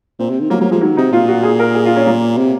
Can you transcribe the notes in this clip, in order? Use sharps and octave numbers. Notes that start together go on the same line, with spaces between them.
A#2 C4
C3
D#3
F#3 A#3
F#3 A#3
F3 G#3
D#3 F#3
C3 D#4
A#2 F4
F#4
G#4
A#4
G#4
F4
C#4
A#3
C3